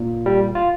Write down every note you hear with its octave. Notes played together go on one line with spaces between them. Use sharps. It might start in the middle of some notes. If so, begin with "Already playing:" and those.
Already playing: A#2
G3
F4